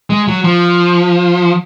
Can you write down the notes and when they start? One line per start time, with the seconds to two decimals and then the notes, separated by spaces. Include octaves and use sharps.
0.10 G#3
0.28 F#3
0.44 F3